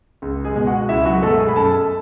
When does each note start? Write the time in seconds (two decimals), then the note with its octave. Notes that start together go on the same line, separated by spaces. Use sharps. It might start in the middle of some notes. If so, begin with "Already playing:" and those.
0.22 C#2
0.45 G#3 G#4
0.56 B2 G#3
0.67 F#4 F#5
0.89 C#2 E4 E5
1.05 F#3 F#4
1.22 B2 G#3 A3 A4
1.39 G#4 G#5
1.48 B5
1.56 F#2 A4 A5